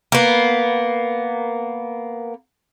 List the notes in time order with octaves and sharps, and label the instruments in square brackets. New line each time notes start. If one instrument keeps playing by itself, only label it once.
[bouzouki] A#3 B3